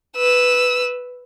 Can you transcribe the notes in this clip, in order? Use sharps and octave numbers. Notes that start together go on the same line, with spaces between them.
B4 E6